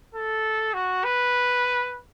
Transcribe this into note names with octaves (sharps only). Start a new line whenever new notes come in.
A4
F#4
B4